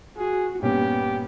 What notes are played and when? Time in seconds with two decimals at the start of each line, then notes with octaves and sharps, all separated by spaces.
0.17 F#4 G#4
0.62 G2 A#2 B3 C#4 G4